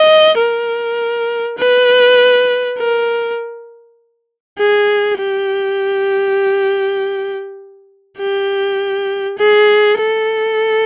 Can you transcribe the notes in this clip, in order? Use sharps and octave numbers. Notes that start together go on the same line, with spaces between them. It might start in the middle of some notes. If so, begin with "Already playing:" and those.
Already playing: D#5
A#4
B4
A#4
G#4
G4
G4
G#4
A4